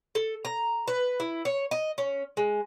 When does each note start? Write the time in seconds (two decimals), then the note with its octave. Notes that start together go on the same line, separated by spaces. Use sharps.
0.15 A4
0.45 A#5
0.88 B4
1.20 E4
1.45 C#5
1.71 D#5
1.98 C#4
2.37 G#3